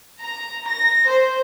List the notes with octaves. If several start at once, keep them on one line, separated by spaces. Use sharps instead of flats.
A#5
A#6
C5